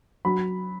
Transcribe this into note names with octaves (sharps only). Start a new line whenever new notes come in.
F#3 B5